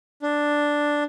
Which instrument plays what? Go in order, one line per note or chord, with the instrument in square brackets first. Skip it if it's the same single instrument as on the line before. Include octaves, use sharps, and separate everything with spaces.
[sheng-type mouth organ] D4